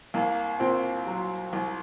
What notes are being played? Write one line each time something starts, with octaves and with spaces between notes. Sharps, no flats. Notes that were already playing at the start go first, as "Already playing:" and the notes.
C2 A#3
A#2 C4
F#3
C2